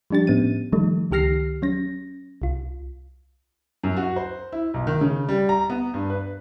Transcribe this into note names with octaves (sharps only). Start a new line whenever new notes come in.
F3 G3 D4 G4 A6
A2 B3 C#4 D#7
D#3 F3 G3 A3 D#4
C#2 D#3 G4 F6 A#6 C7
F#3 C#4 A#6
C2 F4
F#2
F#4
C5
E4
B1
D#3
C#3
G3
A#5
B3
G2
B4